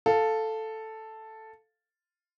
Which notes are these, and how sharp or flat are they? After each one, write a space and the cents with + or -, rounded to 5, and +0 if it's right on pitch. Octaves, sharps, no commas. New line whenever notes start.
A4 +0 F5 +0